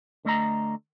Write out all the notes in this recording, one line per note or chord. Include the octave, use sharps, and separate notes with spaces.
D3 A3 D#5 A#5